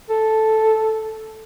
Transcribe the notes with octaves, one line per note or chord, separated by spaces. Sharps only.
A4